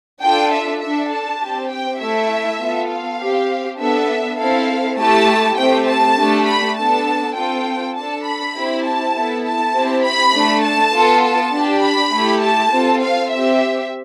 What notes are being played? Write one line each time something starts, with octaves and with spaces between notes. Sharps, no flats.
D4 F4 A4 G5
E5
D4 A4 E5
A5
C4 G4
G5
A3 E4 A4 E5
B3 F4 A4
F5
C4 G4
B3 D4 A4 E5
C4 E4 A4 F5
A3 E4 G4 A5
A3 C4 G4 G5
A5
A3 D4 G4
B5
B3 D4 A4 A5
C4 F4 A4 G5
D4 A4 A5
B5
C4 E4 G4
A5
B3 E4 A4
A5
C4 E4 G4
B5
A3 D4 A4
A5
B3 F4 A4
A5
D4 G4
B5
A3 E4 G4
A5
C4 F4 A4
F5
C4 G4 E5